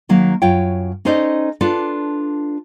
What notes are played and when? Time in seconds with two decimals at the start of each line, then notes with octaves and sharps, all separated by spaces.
0.09 D#3 F#3 A#3
0.42 F#2 F4 C#5 G5
1.05 C#4 D#4 A4 C5 D5 D#5
1.61 D4 F4 A4 B4 D5